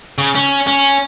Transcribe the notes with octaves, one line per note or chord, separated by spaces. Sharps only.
C#3
C#4
C#4